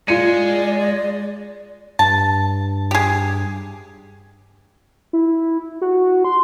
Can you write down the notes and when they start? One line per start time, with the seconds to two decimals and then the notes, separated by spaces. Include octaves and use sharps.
0.08 G#3 F4 D5 C#7 D#7
1.99 G2 A5
2.91 G4 G#4
5.13 E4
5.81 F#4
6.24 C6